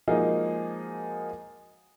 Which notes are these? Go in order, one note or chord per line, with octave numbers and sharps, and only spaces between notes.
F3 G#3 A#3 D#4 F#4 G#4